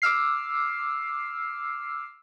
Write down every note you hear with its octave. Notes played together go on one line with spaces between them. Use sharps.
D6 E6 F6 C7